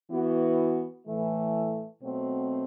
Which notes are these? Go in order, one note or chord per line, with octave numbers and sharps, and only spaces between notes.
E3 B3 F#4
A2 E3 A3
B2 F#3 A3 C4